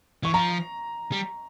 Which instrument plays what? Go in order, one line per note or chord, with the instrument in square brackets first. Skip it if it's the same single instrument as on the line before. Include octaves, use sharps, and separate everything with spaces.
[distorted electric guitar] E3 [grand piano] C#6
[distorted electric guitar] F3 [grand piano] A#5
[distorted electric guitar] G3